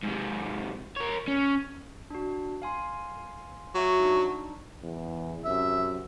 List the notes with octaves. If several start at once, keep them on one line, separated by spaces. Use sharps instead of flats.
G#2 C3
A#4 C#5
C#4
D4 F#4
F5 G#5 C6
F#3 F#4 E5 C#6
D4 D#4
E2
F#2 C3 E5